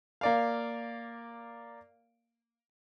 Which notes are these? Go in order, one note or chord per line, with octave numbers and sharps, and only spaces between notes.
A#3 D5 F5